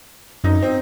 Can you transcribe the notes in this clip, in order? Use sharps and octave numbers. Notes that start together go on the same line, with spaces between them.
F#2 D#4
C4